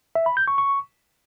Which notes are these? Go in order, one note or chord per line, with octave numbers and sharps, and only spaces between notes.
E5
B5
G6
C#6
C#6